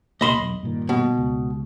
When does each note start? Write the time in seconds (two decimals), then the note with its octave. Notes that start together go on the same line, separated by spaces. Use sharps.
0.21 C#2 B2 A#3 D#5 B5 C6
0.38 E1 B1
0.63 G2 A#2 D#3
0.89 B2
1.17 C#2